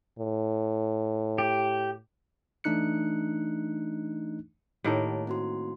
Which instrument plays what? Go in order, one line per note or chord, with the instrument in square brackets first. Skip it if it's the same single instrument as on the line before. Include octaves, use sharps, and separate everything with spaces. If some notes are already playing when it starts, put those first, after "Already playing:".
[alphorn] A2
[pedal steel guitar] G4
[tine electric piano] E3 A3 D4 D#4 F#6 C#7
[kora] A2 D#3 A#3 [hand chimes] G4 C#5 A5
[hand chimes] C4 F#4 C6